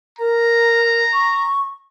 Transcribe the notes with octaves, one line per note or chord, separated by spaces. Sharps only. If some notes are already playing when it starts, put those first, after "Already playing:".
A#4 A#5
C#6